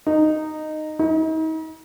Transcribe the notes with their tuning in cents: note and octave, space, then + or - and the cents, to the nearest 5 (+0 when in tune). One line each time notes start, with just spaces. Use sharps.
D#4 -10
D#4 +40